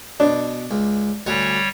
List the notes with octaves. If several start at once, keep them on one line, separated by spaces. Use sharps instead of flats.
B2 D4
C#2
D2 G3 C#5 F#5 G#5